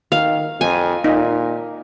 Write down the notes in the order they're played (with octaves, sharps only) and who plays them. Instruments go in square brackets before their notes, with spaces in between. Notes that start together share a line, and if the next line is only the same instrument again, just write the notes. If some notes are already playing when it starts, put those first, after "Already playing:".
[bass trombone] D#3 [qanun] F5
[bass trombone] F2 [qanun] G#5
[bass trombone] A#2 [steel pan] D#4